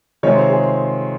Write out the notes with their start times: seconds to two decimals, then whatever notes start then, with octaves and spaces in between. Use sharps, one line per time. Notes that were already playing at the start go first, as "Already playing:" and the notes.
0.23 C3 D#3 G#3 C4 F4 C#5
0.36 C5
0.49 G#4